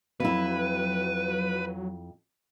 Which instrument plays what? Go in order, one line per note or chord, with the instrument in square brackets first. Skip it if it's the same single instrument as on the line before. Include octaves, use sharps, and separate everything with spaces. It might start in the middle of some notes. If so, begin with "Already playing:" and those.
[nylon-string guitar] F2 E4 [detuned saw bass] F#3 [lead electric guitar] B4